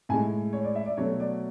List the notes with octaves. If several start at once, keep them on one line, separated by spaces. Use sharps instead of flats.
A2 G#3 G#5
C#5
D5
E5
D5
B2 F#3 A3 C#5
D5